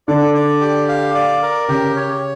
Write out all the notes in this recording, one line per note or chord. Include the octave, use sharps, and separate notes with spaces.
D3 D5
D5
G4
F5
D5
A#4
C#3 G4
C#5